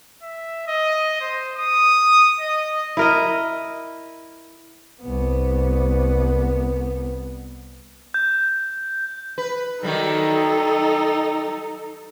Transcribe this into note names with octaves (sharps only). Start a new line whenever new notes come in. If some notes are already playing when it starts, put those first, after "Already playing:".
E5
D#5
C5
D#6
D#5
E4 A#4 D#5
C2 B3
G6
B4
D#3 F#3 G3 D#4 A4